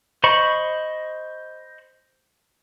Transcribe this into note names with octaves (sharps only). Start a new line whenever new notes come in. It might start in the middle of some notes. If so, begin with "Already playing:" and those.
C5 D#5 B5 C#6